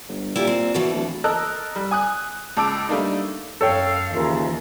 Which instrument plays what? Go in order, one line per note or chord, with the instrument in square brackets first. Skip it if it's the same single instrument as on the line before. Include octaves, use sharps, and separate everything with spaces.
[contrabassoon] G1
[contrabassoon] A#2 [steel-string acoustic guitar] E4 G4 A4
[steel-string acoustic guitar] C4
[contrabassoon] B2 [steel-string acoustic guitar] E3 C4 A4
[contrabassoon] D1
[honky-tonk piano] A4 A#4 D#5 E6 F#6
G3
G#5 D#6 F#6
C#2 A5 D6 E6 D7
G3 A3 A#3 D4 D#4
[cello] F#2 F5 [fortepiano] A4 C#5 G5
[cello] D#2 E3 [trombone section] C#3 F4 A#4